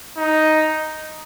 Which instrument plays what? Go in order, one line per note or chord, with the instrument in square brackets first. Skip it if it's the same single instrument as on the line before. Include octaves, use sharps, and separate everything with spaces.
[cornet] D#4